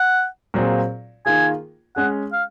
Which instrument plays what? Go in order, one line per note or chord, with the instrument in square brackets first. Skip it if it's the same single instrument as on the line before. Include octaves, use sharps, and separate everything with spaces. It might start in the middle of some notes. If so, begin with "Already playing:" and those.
Already playing: [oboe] F#5
[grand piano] A#2 F#3 C4 F4 G#4
[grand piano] D#3 A#3 F4 G#4 [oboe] G#5
[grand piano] G#3 C#4 G#4 [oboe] F#5
[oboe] F5